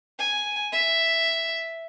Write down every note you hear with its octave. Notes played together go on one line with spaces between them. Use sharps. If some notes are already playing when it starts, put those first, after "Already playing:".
G#5
E5